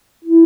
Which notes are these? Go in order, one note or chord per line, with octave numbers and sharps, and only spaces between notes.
E4